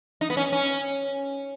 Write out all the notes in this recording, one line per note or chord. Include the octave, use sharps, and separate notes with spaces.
D#4
B3
C#4
C#4